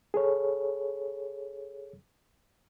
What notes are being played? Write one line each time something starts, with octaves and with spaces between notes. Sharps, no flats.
G#4 A4 C#5